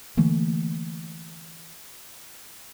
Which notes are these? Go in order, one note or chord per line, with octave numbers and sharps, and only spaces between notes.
D3 E3 A3 A#3